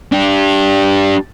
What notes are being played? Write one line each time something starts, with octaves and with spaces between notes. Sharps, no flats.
D4 G4